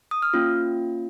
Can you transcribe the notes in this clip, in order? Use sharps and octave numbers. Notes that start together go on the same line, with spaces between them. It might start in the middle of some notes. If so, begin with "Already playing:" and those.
D#6
F6
A#3 C#4 F4